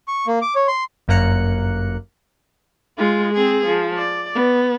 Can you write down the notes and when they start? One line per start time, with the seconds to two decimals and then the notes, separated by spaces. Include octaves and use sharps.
0.08 C#6
0.27 A#3
0.41 D6
0.55 C#5
0.67 C6
1.08 G1 F#2 A#3 A#5 F#6 C#7
2.98 G#3 F4
3.33 C4 G#4
3.66 F3
3.97 D5
4.35 B3